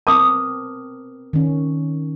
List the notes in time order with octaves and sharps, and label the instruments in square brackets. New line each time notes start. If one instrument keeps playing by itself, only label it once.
[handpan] B3 C4 A#4 [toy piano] A5 D6 D#6
[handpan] D#3 C#4